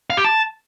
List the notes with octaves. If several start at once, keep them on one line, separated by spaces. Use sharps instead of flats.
F5
G4
A5